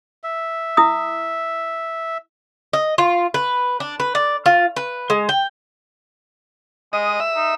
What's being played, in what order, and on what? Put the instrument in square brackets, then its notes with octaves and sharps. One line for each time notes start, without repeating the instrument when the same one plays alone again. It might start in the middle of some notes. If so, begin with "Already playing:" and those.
[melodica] E5
[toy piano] E4 D#6
[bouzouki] D#5
F4
B4
D4
B4
D5
F4
B4
G#3
G5
[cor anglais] G#3 [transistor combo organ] D#5
[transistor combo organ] E5
[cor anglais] D#4